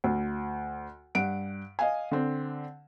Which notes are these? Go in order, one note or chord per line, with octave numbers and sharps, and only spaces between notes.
D2
G2 F#5 D7
D#5 F5 G#5
D3 C4